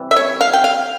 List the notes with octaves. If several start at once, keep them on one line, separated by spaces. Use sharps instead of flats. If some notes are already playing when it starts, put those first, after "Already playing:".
Already playing: C3 E3 G3
E5
C#5
F5
G5
F5